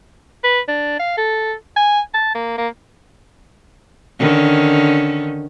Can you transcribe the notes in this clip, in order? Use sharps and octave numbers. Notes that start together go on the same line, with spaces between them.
B4
D4
F5
A4
G#5
A5
A#3
A#3
D3 D#3 C#4